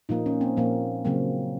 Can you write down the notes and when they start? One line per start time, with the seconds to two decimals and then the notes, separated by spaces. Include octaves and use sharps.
0.09 A#2 F3 A#3 D#4
0.26 C#4
0.41 C4
0.57 A#2 F3 A#3
1.05 C#3 F#3 A#3 C4